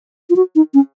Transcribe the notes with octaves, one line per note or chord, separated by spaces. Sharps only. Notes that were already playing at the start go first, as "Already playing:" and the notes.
F4
F#4
D#4
C#4